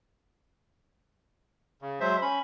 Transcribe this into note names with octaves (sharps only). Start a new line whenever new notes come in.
C#3
F#3 G#3 C5 E5
C#4 B5